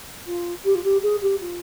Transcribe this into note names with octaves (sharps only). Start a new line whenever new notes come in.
F4
G4
F4
G4
G#4
G4
F4